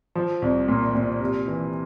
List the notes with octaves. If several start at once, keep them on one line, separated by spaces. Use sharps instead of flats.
F3
C2
A#2
A#2
C3
E3